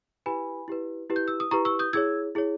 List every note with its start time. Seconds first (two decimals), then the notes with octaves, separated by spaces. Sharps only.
0.26 E4 G4 B4 G#5 B5
0.68 E4 G4 B4
1.10 E4 G4 B4
1.16 G6
1.28 E6
1.40 D#6
1.51 E4 G4 B4 A#5 C#6
1.65 C#6 E6
1.79 D#6 G6
1.93 E4 G#4 C#5 E6 G#6
2.35 E4 G#4 C#5